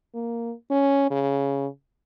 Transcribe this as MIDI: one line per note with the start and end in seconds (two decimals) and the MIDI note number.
0.15 0.53 58
0.71 1.09 61
1.11 1.67 49